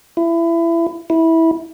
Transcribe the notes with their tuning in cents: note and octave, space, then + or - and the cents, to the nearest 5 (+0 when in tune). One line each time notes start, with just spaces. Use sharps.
E4 +25
E4 -15